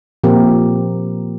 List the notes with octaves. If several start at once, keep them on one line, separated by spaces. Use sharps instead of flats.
A#2 F3 C4 G4 A#4